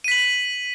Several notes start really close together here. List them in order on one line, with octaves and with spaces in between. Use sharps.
D#7 B6 F#7